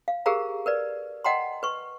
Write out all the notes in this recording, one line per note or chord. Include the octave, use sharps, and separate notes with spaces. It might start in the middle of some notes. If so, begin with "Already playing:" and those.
F5
G4 G#4 A#4 C5 F5 A#5
A#4 B4 D5
D#5 F#5 G5 A#5 C6
B4 C#6